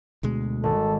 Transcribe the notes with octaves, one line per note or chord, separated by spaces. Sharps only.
D2 B2 G#3
G#1 A4